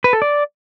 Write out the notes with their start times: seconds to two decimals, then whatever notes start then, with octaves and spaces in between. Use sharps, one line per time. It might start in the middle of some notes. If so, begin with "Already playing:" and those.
0.04 B4
0.13 A4
0.22 D5